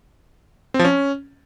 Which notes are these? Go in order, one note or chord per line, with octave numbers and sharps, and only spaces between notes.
C4
F3
C#4